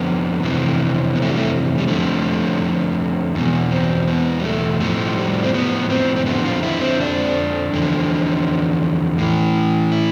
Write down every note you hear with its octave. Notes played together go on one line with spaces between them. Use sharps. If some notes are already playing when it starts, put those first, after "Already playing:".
Already playing: F2 D3 F3 B3
F2 C3 E3
B3
A3
G3
A3
G3
F2 D3 F3 A3
E2 B2
C4
B3
G3
A3
A2 F3 A3
G3
C4
B3
C4
C4
F2 D3 F3 B3
F4
E4
C4
D4
E2 D3 F3
A2 E3
E4